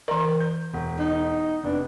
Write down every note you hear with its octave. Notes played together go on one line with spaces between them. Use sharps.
E3 A#4 D5 A#5
G6
E1
D#4
F1 B3 D4